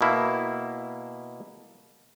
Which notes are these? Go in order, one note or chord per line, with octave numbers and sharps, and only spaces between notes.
B2 A#3 E4